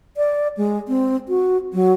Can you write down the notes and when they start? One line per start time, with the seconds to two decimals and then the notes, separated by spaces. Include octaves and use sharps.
0.17 D5
0.57 G#3
0.88 C4
1.29 F#4
1.73 F#3